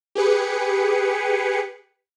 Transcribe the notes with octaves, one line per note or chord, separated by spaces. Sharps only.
G4 G#4 B4 C#7